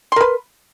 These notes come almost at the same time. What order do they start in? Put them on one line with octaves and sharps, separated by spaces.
C6 A#4 B4